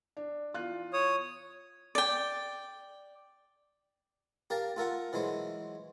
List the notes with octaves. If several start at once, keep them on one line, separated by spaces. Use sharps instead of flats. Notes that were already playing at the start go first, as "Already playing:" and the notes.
D4
E2 F4 F#6
C#5 D#6
D5 G5
G4 A#4 F5 A5
F4 A4 A#4 F#5
E3 F#3 G#3 C5